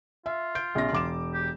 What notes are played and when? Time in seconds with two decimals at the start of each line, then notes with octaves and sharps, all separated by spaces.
0.26 F4 E5
0.55 G6 D7
0.75 A#1 C3 A#6
0.93 E1 D6 E7
1.34 G4